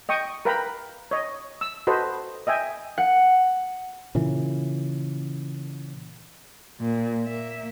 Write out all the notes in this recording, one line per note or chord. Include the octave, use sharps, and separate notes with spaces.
D#5 G5 C#6 D#6
A#4 B4 F5 G5 A#5 B5
C#5 D#5
E6
F#4 A4 B4 C5 D#5
D#5 E5 G5 G#5
F#5
A#2 C#3 E3
A#2
A#3 E5